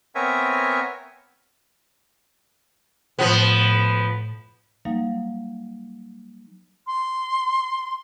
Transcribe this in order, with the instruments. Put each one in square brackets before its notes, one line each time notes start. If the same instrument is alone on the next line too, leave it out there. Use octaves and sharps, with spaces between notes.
[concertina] B3 C4 A#4 C#5 E5 G#5
[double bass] A2 [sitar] F3 B3
[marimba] F#3 G3 A#3 D#4 F5
[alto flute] C6